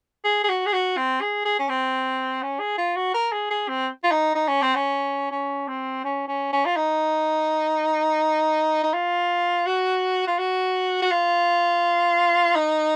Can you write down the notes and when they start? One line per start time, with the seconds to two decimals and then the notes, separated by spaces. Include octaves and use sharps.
0.25 G#4
0.44 G#4
0.49 F#4
0.66 G#4
0.73 F#4
0.97 C4
1.21 G#4
1.45 G#4
1.59 C#4
1.69 C4
2.43 C#4
2.60 G#4
2.78 F4
2.96 F#4
3.14 A#4
3.32 G#4
3.51 G#4
3.69 C4
4.04 F4
4.11 D#4
4.35 D#4
4.48 C#4
4.62 C4
4.75 C#4
5.31 C#4
5.68 C4
6.04 C#4
6.28 C#4
6.53 C#4
6.66 F4
6.76 D#4
8.84 D#4
8.94 F4
9.67 F#4
10.27 F4
10.39 F#4
11.02 F#4
11.12 F4
12.56 D#4